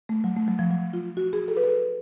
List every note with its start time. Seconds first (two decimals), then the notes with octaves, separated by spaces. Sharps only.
0.09 A3
0.24 F#3
0.36 A3
0.48 F#3
0.59 F3
0.71 F#3
0.93 F4
1.17 F#4
1.33 G#4
1.48 A4
1.57 B4
1.64 A4